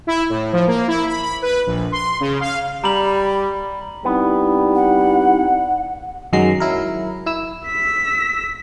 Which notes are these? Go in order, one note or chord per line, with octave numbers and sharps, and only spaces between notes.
E4
A2
F3
A#3
E4
B5
B5
B4
A#1
C6
C#3
F5
G3 A#5 B5 F#7
G3 B3 C4 D#4 E4
F#5
F#2 D#3 F#3 G#3 A#5 C7
F#3 E4 A#4
E4 E6
E6 B6